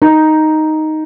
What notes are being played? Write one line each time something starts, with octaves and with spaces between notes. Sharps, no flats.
D#4